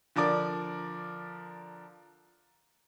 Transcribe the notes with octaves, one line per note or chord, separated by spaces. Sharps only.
D3 F3 A#4 D5 D6